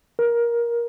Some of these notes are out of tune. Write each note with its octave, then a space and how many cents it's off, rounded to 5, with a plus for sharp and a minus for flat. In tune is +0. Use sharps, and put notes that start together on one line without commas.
A#4 +15